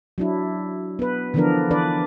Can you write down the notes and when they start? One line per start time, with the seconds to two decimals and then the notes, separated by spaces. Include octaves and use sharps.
0.18 F#3 D4 E4
0.99 B3 B4
1.34 D3 E3 F3 B3 D4 A#4
1.71 E3 D4 B4 D5